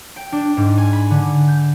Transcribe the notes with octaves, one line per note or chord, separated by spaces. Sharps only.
G5
D4
G#2
G#5
B5
D3
G6